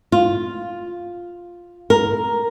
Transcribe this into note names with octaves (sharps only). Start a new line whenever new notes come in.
F4
A#4